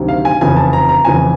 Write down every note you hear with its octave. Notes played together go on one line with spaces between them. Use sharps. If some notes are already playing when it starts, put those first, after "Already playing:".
Already playing: D2 C3 D#3 F#3
F5
G#5
F1 E2 C#3 F3 G#5
A5
A#5
A#5
F1 E2 C#3 F3 G#5